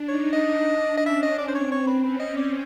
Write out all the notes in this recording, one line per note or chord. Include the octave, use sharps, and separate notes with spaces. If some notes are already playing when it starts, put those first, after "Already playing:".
Already playing: D4
D#4 C#5
D#5
D4
D#5
C#4 E5
D#5
D5
C5
C4 C#5
C#5
B4
C#4 B4
D#5
D5